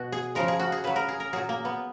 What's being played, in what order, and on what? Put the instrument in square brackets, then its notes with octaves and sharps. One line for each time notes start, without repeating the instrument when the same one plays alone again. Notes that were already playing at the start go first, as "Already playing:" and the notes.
Already playing: [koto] B2 F#4
G#4
C#3 F3 G#3 A#4
G#4
F#4
G#4
C#3 F#3 B4
A#4
G#4
A#4
A#2 F#3 G#4
A#3
B3